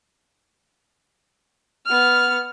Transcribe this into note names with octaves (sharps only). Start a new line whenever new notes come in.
B3 F6